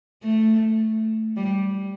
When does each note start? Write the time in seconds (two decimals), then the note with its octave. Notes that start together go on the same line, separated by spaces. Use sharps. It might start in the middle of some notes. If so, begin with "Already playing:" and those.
0.23 A3
1.36 G3